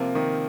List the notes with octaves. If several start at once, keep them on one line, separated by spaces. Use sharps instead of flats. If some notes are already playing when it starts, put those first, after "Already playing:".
Already playing: C3 F3 A#3
D#3